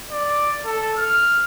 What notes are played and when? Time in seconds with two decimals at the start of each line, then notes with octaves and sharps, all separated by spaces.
0.12 D5
0.66 A4
0.98 F6